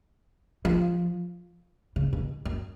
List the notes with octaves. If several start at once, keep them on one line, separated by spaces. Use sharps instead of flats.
F3
C#3
B2
F#2